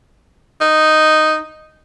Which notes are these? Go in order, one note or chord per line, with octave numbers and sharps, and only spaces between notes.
D#4